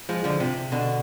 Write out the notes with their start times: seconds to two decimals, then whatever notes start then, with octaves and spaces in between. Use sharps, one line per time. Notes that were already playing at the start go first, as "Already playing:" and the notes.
0.09 F3 G#3
0.24 D3 F3
0.40 C3
0.72 B2 D3